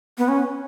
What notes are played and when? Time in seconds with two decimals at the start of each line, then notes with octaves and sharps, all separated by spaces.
0.18 B3
0.28 C#4